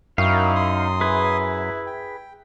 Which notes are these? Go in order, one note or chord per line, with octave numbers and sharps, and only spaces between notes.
F#2 D#4 E4 F#4 A#4 F5 G5
C6 D#6
E4 G#4 B4
G5